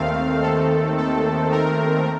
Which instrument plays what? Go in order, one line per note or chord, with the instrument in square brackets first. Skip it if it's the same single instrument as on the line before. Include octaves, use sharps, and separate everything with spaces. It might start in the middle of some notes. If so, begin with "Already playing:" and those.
Already playing: [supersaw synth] D#2 D#3 A3 C4 F5
A4
A4
A#4